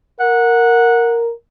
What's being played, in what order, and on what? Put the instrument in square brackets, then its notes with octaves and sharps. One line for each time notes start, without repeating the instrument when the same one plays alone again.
[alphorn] A#4 [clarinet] F#5